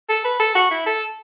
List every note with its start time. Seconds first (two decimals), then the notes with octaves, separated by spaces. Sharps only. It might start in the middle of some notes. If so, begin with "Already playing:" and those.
0.09 A4
0.24 B4
0.40 A4
0.55 F#4
0.71 E4
0.86 A4